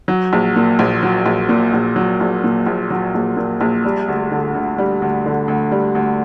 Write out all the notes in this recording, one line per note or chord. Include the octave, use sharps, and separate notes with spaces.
F#3
A#1
A#2
A#1
F#3
A#1
A#2
A#1
F#3
A#1
A#2
A#1
F#3
A#1
A#2
A#1
G3
D2
D3
D2
G3
D2
D3
D2
G3
D2